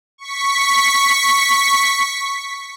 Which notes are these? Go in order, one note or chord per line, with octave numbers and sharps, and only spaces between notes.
C#6 B6